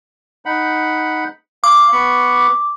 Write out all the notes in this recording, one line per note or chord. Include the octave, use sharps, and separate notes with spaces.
D#4 F#5 B5
F5 D6
B3 B5 C#6